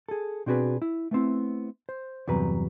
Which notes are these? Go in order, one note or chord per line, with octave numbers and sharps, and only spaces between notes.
G#4 A4
B2 C4 D4 F#4 G#4 B4
E4
A3 B3 C4 E4
C5
E2 G2 C3 F#3 B4 A#5